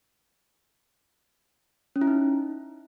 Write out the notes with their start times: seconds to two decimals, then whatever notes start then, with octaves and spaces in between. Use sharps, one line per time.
1.96 C#4
2.01 E4
2.07 D#4